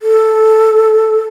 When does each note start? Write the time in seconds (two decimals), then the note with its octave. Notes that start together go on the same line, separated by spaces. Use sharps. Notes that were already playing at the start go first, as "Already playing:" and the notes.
0.02 A4